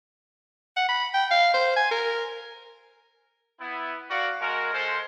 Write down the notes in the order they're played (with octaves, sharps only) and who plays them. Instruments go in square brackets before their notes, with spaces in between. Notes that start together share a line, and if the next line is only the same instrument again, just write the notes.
[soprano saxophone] F#5
B5
G5
F5
C5
G#5
A#4
[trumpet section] B3 E4
F#4 A#4 D5 F5 F#5
G#3 F#4 A#4
G#3 F4 A4 C5